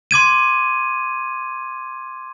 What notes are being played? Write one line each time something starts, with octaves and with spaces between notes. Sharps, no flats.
C6 D6 G#6 D#7